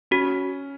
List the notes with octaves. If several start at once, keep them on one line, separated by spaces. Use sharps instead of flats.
C#4 F#4